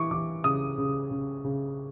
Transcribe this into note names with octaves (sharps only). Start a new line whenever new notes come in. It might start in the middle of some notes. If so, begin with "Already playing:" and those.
Already playing: E3 C#6 D6
E3 D6
C#3 D#6
C#3
C#3
C#3